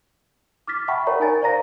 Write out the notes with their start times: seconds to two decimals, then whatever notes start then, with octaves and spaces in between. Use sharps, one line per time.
0.67 D6 F6 A6 B6
0.88 E5 F#5 G5 A5 B5 C#6
1.06 A#4 C#5 D5 A#5
1.20 D#4 A#4 G#5 A6
1.42 C5 D5 F5 A#5 A#6